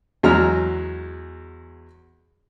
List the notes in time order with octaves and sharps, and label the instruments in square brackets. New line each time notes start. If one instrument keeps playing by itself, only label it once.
[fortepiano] E2 F#3 G#3 A#5 F6